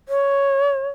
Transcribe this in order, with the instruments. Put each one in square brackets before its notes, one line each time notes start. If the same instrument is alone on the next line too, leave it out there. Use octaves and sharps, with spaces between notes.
[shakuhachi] C#5